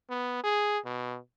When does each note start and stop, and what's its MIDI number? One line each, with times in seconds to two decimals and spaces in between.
0.10 0.42 59
0.44 0.78 68
0.85 1.18 47